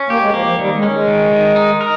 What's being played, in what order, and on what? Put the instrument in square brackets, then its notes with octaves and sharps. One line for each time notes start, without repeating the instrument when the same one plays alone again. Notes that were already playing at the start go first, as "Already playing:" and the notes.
Already playing: [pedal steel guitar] C#4
[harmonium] A#3 [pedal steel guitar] G4
[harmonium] G#3
[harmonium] F3 [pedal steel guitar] A#3
[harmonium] F3
[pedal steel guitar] D#3 [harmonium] G3
[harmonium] G#3
[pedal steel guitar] C#4
[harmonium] G#3
[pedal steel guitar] D#3
D#3
D#4
A#4